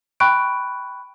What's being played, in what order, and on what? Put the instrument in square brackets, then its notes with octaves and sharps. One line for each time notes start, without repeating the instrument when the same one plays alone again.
[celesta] G5 B5 C#6 F#6 D7